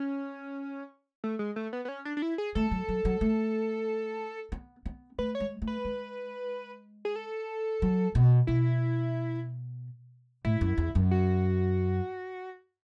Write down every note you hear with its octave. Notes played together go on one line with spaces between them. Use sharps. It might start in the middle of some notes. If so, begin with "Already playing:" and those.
Already playing: C#4
A3
G#3
A3
B3
B3
C#4
D4
D4
E4
G#4
A3 A4
F#3
F#3
F#3
A3
B3
B3
A3 B4
C#5
G#3
A3
B4
G#3
G#4
A4
F#3
B2
B2 E4
A2 E4
F#2
E2
F#2
F#4